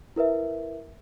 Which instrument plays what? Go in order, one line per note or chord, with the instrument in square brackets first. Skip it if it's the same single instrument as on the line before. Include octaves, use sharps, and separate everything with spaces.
[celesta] E4 A#4 B4 E5